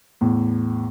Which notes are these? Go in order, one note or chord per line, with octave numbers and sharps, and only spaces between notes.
E2 A2